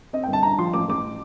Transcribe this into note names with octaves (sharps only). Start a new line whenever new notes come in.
C4 D#5
G5
G1
A5
G2 A#5
F3 C6
A1 D6
A1 D6